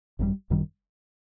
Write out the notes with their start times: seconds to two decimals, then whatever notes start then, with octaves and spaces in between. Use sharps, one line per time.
0.19 G#1 F#2 D#3 G3
0.50 G#1 F#2 D#3 G3